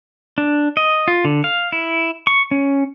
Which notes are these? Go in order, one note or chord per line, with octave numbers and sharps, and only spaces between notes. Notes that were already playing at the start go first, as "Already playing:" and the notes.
D4
D#5
F4
D3
F5
E4
C#6
C#4